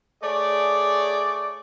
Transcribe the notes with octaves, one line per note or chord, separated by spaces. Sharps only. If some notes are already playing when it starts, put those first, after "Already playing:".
A3 G#4 C#5 D5